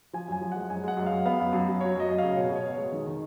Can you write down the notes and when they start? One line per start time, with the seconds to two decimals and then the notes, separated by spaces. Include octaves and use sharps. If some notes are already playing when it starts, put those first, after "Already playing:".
0.13 F3 G#5
0.28 F#2 G#5
0.41 F3
0.52 G#3 F#5
0.70 F#2 G#5
0.84 G#3 F#5
0.97 F#2
1.06 F5
1.12 F#2
1.26 B3 F5
1.40 F#2
1.53 F#2
1.68 F#2
1.81 F#3 C#5
1.96 F#2 D#5
2.09 F#2
2.18 C#3 F5
2.37 B2 C#5
2.51 B2 C#5
2.65 B2
2.74 G#3 C#5
2.92 D#3
3.07 D#3